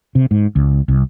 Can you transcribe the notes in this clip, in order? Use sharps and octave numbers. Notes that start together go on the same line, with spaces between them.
C3
G#2
C#2
C2